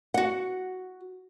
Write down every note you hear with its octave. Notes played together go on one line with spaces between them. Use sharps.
F#4 F#5